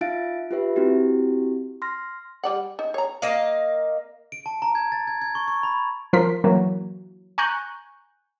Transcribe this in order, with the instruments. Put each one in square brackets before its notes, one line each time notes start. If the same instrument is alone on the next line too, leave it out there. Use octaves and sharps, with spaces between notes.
[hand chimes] D#4 F4 E5 F5 A6 D7
F4 G4 B4 E5
C4 E4 F#4 G4
C6 F6 A#6
[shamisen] G3 D5 F#5
D#4
C#5 A#5
[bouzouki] A#3 D#5 F5
[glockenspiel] D7
A5
A#5
G#6
A6
G#6
G#6
C#6
C#6
B5
[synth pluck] F3 A#4 C6 B6
E3 F#3 A#3
G#5 A#5 C#6 F#6 G6